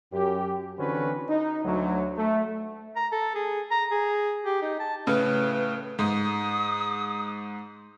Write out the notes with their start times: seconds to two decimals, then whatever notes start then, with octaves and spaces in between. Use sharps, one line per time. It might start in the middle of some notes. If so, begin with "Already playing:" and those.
0.13 F#2 G4
0.79 D3 E3 C4 C#4 F#4 B4
1.29 D#4
1.65 D2 F#3
2.17 A3
2.96 A#5
3.12 A4
3.35 G#4
3.71 A#5
3.91 G#4
4.44 G4
4.62 D#4
4.80 A5
5.07 A2 C#3 B4
5.99 G#2 D#6